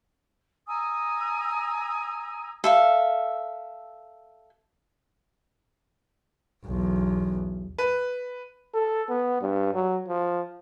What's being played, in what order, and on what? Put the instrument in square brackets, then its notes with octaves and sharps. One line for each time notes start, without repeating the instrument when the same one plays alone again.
[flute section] G#5 A#5 D#6 E6
[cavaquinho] A4 E5 F5
[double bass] B1 E2
[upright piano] B4
[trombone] A4
B3
G2
F#3
F3